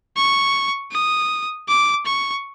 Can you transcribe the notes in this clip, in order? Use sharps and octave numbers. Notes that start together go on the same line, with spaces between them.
C#6
D#6
D6
C#6